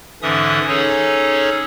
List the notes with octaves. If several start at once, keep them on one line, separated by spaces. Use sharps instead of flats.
G#2 D3 E3 C#4 E5 D#6
C#4 D#4 G#4 A4 C#5